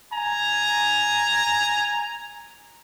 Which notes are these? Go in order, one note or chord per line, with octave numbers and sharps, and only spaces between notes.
G#5 A#5